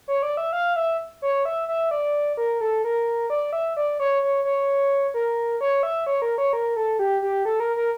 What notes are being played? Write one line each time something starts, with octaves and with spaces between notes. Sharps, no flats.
C#5
D5
E5
F5
E5
C#5
E5
E5
D5
A#4
A4
A#4
D5
E5
D5
C#5
C#5
C#5
A#4
C#5
E5
C#5
A#4
C#5
A#4
A4
G4
G4
A4
A#4
A#4